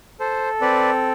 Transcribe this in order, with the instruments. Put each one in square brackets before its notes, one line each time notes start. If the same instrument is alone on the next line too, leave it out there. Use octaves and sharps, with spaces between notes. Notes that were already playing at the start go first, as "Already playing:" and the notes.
[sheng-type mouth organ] A4 C5
C4 B4 D5